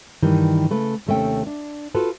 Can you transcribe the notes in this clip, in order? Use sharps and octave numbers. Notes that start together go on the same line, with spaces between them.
G2 D#3 E3 G3
C#3 A3 B4
D#2 C3 A3 C#4 G5
D4
F4 F#4 A4 B4